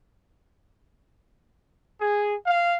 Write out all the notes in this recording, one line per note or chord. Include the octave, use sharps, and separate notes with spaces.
G#4
F5